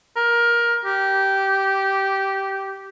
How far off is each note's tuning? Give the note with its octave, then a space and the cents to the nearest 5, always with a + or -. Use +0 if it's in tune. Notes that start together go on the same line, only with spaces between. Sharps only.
A#4 +20
G4 -15